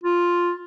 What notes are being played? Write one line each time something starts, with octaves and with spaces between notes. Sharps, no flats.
F4